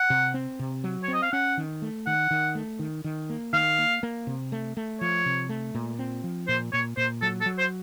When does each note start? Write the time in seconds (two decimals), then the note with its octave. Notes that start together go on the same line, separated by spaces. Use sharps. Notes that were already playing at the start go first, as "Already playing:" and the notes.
Already playing: F#5
0.10 C3
0.34 C4
0.59 C3
0.84 F#3
1.03 C#5
1.08 C4
1.13 D#5
1.23 F5
1.32 C#4 F#5
1.57 D#3
1.82 A3
2.06 D#3 F#5
2.31 D#3
2.55 A3
2.79 D#3
3.04 D#3
3.30 A#3
3.53 D#3 F5
3.79 A#3
4.03 A#3
4.27 C3
4.52 A3
4.77 A3
5.01 F3 C#5
5.26 C3
5.49 A3
5.75 A#2
5.99 C4
6.24 F3
6.48 A#2 C5
6.73 A#2 C#5
6.97 A#2 C5
7.22 F#3 A4
7.41 A4
7.46 F#3
7.58 C5